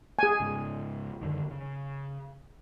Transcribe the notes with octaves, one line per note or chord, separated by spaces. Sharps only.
G#4 G#5
G#2 C#3
F#2 D3 D#3
C#3